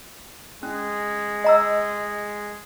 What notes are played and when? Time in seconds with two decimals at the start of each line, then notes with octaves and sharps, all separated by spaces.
0.63 G#3 C#4
1.44 D#5 A#5 E6